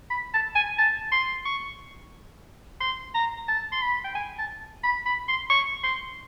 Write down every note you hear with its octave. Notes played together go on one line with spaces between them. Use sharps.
B5
A5
G#5
A5
C6
C#6
C6
A#5
A5
C6
B5
G5
G#5
A5
B5
B5
C6
C#6
C6